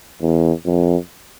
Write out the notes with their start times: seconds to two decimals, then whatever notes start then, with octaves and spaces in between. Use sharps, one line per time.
0.21 E2
0.65 F2